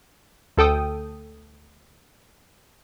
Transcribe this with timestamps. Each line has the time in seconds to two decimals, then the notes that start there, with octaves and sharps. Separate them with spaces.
0.57 D2 A4 G5 D#6